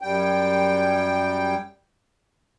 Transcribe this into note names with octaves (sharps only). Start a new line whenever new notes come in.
F#2 G3 G5